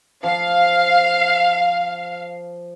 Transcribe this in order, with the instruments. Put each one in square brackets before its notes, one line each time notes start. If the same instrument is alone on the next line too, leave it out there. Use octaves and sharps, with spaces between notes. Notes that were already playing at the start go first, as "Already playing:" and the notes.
[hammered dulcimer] F3 [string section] F5